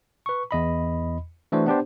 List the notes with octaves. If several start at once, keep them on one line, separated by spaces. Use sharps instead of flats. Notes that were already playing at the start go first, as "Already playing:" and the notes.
B4 C#6
E2 D#5 B5
E3 A3 D4 F#4 C5
B3 D4 G4 C5